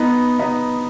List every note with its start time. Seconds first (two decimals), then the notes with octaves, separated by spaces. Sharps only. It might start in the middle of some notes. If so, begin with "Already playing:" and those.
Already playing: B3 D#4
0.39 B3 D#4